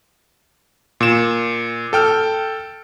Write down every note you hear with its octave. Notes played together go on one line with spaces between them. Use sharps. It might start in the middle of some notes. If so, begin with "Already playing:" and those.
A#2 E7
A4 G5 F6